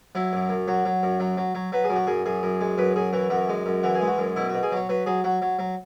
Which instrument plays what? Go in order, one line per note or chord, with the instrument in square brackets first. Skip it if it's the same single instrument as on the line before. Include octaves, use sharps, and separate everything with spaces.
[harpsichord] F#3 E4
F#2
F#2
F#3 F#4
F#3
F#2
F#3
F#3
F#3
F#3 B4
G#4
F#2
F#4
F#2 G#4
F#2 G#4
F#2
G#3
F#2 B4
F#2 G#4
E3 F#4
F#2 F#4
G#3
F#2
E3 F#4
G#4
G#3
F#4
F#2
B2 E4
F#4
B2
G#4
F#3 C#5
F#3 B4
F#3 G#4
F#3 F#4
F#3
F#3